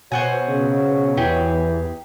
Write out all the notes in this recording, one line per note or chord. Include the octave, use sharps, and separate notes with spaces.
B2 F#3 C5 F#5 G#5
C#3
E2 E3 D#4 G4 G#4